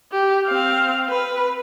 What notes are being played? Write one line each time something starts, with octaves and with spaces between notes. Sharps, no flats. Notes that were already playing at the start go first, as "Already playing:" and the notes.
G4
C4 F5
B4